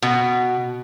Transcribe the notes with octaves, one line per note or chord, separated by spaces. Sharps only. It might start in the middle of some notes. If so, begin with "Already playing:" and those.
B2